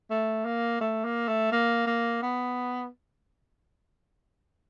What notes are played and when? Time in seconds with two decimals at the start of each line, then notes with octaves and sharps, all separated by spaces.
0.10 A3
0.45 A#3
0.81 A3
1.04 A#3
1.28 A3
1.52 A#3
1.87 A#3
2.22 B3